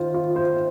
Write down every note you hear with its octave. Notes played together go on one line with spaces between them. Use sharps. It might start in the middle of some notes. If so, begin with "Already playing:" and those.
Already playing: D#3 F4 C5
F4
C5